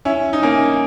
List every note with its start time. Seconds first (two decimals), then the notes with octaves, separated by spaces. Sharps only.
0.05 C#4 E4
0.33 D#4
0.42 A#3 C#4